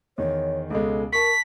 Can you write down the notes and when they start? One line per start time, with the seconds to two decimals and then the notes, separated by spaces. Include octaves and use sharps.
0.18 E2 D#3 C#5
0.70 C#2 B2 G#3 A4
1.13 A#4 A5 C#6 B6